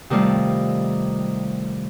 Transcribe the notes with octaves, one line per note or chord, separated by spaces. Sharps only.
C3 D#3 G3 A3 F4